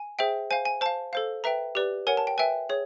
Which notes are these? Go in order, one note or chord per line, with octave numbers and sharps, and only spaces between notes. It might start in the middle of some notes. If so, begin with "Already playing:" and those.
Already playing: G#5
G#4 C5 E5 G5
C5 F5 G#5
G#5
C5 F5 A5
A4 C5 F5
B4 E5 G5 A#5
G4 B4 D5
A#4 C#5 F#5 G#5
A5
G5
B4 E5 G5 G#5
G#4 C#5